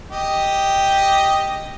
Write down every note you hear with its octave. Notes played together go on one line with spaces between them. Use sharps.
G4 D#5